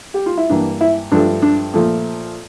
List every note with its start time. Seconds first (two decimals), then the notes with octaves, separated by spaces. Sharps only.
0.14 G4
0.26 F4
0.37 E4
0.49 G2 E3 A#3 D4
0.81 E4
1.12 G2 F3 A3 D4
1.42 D4
1.74 A#2 F3 A3